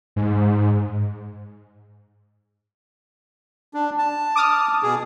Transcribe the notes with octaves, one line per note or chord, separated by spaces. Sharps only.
G#2
D4
A5
D6 D#6 F6
B2 G#4